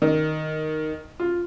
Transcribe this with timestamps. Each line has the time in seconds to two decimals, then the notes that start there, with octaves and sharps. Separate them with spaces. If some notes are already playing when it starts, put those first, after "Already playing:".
0.02 D#3
1.20 F4